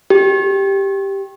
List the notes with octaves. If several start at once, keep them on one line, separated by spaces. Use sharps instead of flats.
G4